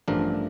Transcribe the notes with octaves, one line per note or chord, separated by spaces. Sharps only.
A1 G2 F3 A3 D4 A#4